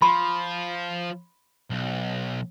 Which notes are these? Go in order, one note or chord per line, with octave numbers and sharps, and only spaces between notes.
F3 B5 C6
B1